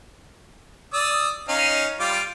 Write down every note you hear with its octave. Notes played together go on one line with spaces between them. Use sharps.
D5 D#6 E6
C#4 D#4 F5
G3 F4 D6